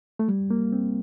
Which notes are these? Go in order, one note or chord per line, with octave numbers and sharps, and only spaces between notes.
A3
G3
A#3
C4